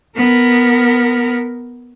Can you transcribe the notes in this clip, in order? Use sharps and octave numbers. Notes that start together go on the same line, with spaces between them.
B3 A#4